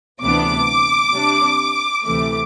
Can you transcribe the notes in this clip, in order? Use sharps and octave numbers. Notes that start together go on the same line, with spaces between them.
D2 C3 E3 B3 D4 D6
C3 G3 D4
D2 C3 E3 A3 D6